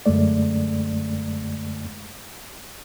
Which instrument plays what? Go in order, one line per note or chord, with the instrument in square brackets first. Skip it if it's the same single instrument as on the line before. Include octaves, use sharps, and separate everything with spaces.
[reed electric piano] F#2 D3 G#3 A3 D5